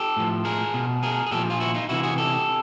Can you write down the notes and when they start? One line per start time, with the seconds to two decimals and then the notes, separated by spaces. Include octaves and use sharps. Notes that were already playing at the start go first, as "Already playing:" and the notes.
Already playing: G4 A4
0.17 A2 F3
0.45 G#4 A#4
0.74 B2
1.03 G#4 A#4
1.26 G#4
1.31 A#2 F3 G4 A4
1.50 F4
1.60 E4 F#4
1.74 D#4 F4
1.89 C3 E3 E4 F#4
2.03 F#4 G#4
2.18 G4 A4